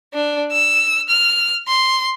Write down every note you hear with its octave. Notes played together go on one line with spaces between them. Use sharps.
D4
E6
F6
C6